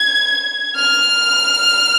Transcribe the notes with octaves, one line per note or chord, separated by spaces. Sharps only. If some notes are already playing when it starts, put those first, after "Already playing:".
Already playing: G#6
F6